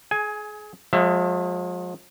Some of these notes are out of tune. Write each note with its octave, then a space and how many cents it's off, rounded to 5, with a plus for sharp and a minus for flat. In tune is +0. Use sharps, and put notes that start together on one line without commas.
G#4 +30 G#5 +10
F3 +45 G#3 +0 E5 +30